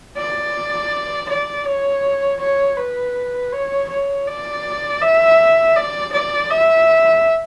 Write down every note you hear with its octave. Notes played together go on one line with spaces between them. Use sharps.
D5
D5
C#5
C#5
B4
C#5
C#5
D5
E5
D5
D5
E5